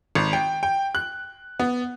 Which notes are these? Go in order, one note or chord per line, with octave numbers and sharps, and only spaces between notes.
G#1
G5
G5
F#6
B3